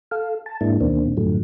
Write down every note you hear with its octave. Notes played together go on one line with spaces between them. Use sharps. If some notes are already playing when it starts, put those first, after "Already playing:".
A4 F5
A5
G#2 G#3 A#3 D4 E4
D2 B2 D#3 A#3 C4 D4
F#2 A2 D3 F3 F#3 A3